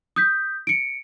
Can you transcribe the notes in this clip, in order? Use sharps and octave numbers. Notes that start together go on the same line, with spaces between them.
D#6 G6 B6
C#7 D7